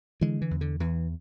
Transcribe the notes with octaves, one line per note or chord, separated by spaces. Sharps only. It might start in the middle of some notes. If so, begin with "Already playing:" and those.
D3 E3 G#3
E3
E2
D3
E2 E3